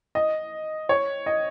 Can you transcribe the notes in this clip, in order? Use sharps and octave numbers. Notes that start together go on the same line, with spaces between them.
D#5
C#5
D#5